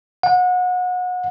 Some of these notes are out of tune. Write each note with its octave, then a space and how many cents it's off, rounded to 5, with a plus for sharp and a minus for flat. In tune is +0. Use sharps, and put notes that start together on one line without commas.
F#5 -30